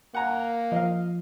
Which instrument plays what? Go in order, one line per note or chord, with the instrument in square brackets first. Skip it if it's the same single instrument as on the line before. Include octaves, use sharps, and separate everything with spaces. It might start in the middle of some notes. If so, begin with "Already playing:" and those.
[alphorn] A#3 [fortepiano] F#5 G#5 A#5
[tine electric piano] F3 [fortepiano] D#5 F5